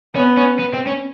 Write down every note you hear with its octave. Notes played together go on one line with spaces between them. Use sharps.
B3 C#4
C#4
B3
C4
C#4